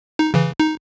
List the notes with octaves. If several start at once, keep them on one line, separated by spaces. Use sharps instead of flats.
D#4
C#3 E3
D#4